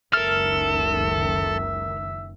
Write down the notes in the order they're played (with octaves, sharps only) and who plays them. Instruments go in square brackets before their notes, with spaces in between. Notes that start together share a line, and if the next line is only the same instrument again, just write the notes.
[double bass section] F#1 C#2 D#3 [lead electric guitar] A4 [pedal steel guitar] A#4 F6 [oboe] E5